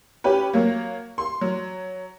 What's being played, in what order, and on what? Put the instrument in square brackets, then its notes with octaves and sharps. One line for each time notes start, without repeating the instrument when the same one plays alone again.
[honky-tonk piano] C#4 G4 B4
F#3 A#3
C6
F#3